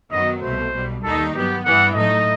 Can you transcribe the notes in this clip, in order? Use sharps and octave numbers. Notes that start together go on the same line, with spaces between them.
F#2 D#3 F#3 B3 D#5
C2 B2 A3 C5
B1 B2 G3
D#2 D#3 G3 D#4 A4
G2 F#3 B3 G4
G2 E3 G3 B3 F#5
A2 F#3 A3 D#4 D#5